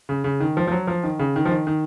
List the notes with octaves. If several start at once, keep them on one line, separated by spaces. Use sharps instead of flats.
C#3
C#3
D#3
F3
F3
F#3
F3
D#3
C#3
D#3
F3
D#3
D#3